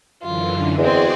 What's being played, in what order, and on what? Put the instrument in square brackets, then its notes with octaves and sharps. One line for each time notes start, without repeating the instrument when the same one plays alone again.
[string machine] F#2 D3 E3 [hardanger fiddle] F4
[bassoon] E2 [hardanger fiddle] G#3 C4 [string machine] F#4 G#4 D5